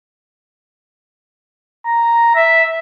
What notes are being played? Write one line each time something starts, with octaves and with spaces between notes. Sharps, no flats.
A#5
E5